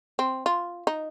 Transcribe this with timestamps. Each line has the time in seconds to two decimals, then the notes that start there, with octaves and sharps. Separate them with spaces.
0.19 C4
0.46 F4
0.87 D#4